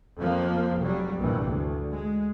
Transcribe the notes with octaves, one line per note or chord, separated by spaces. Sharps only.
F2 F3 A#3
F1 F#3 G3
A#1 G2 C3 E3
D2
G#3